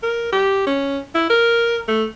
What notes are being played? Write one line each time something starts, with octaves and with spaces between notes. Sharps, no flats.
A#4
G4
C#4
E4
A#4
A3